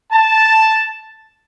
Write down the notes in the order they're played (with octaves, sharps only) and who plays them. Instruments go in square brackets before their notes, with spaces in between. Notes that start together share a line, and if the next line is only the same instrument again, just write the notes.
[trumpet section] A5